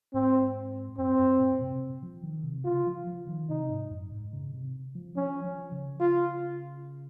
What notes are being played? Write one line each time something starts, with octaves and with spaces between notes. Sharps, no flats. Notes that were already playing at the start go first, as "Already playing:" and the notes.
G#2 C4
F#2 C4
F#2
A#2
C3
F3
D#3
C3
C#3 F4
F3
F3
D#3
C3 D#4
G#2
F#2
G#2
C#3
C3
F3
F3 C#4
F3
C#3
F4